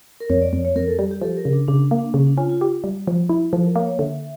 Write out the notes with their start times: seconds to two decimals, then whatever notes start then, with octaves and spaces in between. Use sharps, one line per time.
0.20 A#4
0.30 F2 C#5
0.42 D5
0.53 F2 C#5
0.65 C#5
0.76 F2 A#4
0.87 A4
0.98 G3 G4
1.11 G4
1.22 F3 A4
1.37 A#4
1.45 C#3
1.53 D4
1.68 C#3 D4
1.91 A#3
1.99 D4
2.14 C#3 C#4
2.27 D4
2.37 C#4 F4
2.50 F4
2.61 G4
2.84 G3
3.07 F3
3.29 E4
3.53 F3 A4
3.65 A#4
3.76 A#3 C#5
3.87 C#5
3.99 D3 E5